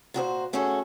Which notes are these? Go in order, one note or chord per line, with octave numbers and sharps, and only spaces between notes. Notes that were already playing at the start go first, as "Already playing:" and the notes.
A#2 F#4 G#4 C5
A3 C#4 F#4 G#4 A4